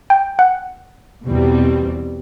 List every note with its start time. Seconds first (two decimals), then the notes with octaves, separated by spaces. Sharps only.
0.10 G5
0.39 F#5
1.26 E2 B2 G3 C4